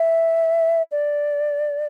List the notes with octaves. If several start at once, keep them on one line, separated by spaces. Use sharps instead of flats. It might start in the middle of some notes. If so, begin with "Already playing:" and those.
Already playing: E5
D5